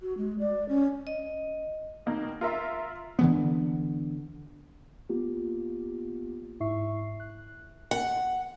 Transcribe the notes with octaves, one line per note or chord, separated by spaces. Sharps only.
F#4
G#3
D5
C#4
D#5
B2 D#3 A#3 A#4
F4 A#4 E5 C6
D3 E3 B3
A#3 B3 F4 G4
G#2 E4 E5 C#6 C7
F#6
F#5